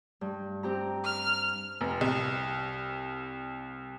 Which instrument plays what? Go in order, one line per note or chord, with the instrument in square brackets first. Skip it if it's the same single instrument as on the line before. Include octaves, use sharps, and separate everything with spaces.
[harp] G2
C4 G4 A#5
[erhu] F6
[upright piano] F1
C2